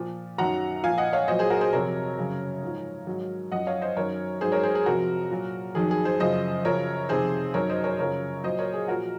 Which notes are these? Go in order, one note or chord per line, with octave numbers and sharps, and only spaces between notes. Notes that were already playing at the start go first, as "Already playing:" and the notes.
Already playing: A#2 F3
F#2 D#3 F#3 F#5 A#5
A#2 F3 F5 G#5
D#5 F#5
C#5 F5
A#2 F#3 C5 D#5
G#4 C5
F#4 A#4
G#4 C5
F2 C3 F#3 A#4 C#5
F#2 C#3 F#3
G#2 F3
G#2 D#3 F#3
F#2 F3 D#5 F#5
C#5 F5
C5 D#5
F#2 D#3 F#3 A#4 C#5
G#2 F#3 G#4 C5
A#4 C#5
G#4 C5
G#4
F2 C3 F3 F#4 A#4
A#2 F#3
F2 D#3 F#3 G#4
G#4
G#4 C5
F#2 C#3 F3 C5 D#5
F#2 C#3 F3 A#4 C#5
F2 C3 D#3 G#4 C5
F#2 D#3 F#3 A#4 C#5
C5 D#5
A#4 C#5
F#2 C#3 F3 A#4 C#5
A#2 F#3 C5 D#5
A#4 C#5
G#4
A#2 F3 F#4 A#4